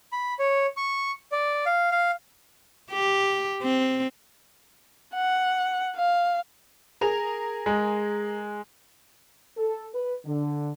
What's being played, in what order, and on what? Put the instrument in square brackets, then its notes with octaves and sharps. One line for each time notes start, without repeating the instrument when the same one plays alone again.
[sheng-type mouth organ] B5
C#5
C#6
D5
F5
F5
[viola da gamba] G4
C4
[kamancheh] F#5
F5
[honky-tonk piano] G#4 A#4 F7
[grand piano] G#3
[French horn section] A4
B4
D3